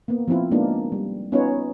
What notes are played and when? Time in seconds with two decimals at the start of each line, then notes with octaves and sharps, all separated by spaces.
0.08 A#3 B3
0.28 F3 B3 C4 E4 F4
0.51 G#3 A#3 B3 D4 D#4 F4
0.92 G3
1.32 B3 C#4 D#4 F4 B4 C#5